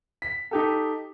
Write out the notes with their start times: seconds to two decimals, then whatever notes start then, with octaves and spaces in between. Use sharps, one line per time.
0.22 B6
0.51 D#4 G4 A4